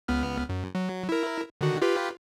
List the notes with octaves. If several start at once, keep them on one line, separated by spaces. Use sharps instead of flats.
C#2 B3 F6
F#2
F#3
E4 A#4
D3 D#3 F#4
F4 G4 B4